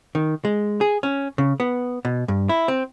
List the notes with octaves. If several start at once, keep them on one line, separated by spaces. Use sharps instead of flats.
D#3
G#3
G#4
C#4
C#3
B3
B2
G2
E4
C4